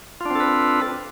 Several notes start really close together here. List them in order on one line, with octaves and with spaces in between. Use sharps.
F4 D4 C4 A4 B4